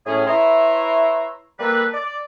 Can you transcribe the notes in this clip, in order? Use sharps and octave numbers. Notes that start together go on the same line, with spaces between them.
A2 C#4 G#4
E4 B4 C#5 E5 A#5 C6
G3 A#3 A4 B4
D5